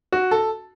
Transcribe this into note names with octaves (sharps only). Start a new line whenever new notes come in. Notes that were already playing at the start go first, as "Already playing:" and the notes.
F#4
A4